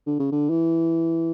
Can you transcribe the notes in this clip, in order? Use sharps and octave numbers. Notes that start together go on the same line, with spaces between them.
D3
C#3
D3
E3